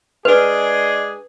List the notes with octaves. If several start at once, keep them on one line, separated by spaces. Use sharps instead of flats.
G#3 D4 G#4 B4